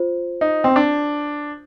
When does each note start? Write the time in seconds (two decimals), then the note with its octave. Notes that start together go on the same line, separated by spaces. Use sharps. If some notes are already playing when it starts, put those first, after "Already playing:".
Already playing: F4 C5
0.41 D#4
0.64 C4
0.76 D4